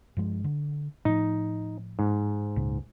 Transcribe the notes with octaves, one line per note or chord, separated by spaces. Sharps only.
G2 F3 G#3
D3
A2 F3 D#4
G#2
C#2 A#2 C#3